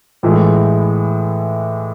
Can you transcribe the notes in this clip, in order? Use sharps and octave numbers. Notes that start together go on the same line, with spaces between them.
A2 E3 G#3